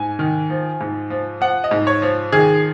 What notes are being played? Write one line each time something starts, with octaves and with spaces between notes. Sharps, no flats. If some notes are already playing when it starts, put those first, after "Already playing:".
Already playing: G#2 G#5
D#3
F3
G#2
F3
F3 F#5
D#5
G#2
C#5
F3
D#3 G#4